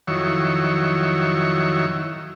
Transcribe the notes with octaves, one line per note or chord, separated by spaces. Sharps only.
F2 D#3 F#3 E4 C#5